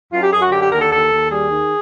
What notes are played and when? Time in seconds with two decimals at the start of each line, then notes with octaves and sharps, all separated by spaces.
0.12 F#2 F4
0.23 G4
0.32 F#2 G#4
0.42 F#4
0.52 D3 G4
0.62 G4
0.72 D#2 A#4
0.81 A4
0.91 D#2 A4
1.11 D#2
1.31 G3 G#4
1.51 D#3